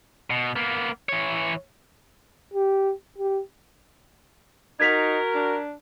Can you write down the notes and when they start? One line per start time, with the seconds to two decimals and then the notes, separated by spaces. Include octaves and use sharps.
0.30 B2
0.56 A#3 B3
1.09 E3 C#5
2.54 G4
3.18 G4
4.80 D#4 F#4 A#4 G#6 B6 F7
5.35 D4